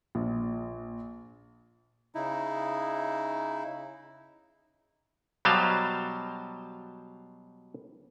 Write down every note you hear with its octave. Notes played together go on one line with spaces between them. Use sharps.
A#1
C#3 D#4 E4
B2 F#3 G3 C5 F5 A5